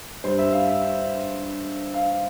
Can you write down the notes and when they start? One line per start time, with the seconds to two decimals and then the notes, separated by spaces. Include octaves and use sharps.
0.24 G2 G3 C5
0.38 E5
0.53 F5
0.67 E5
0.81 E5
1.94 F5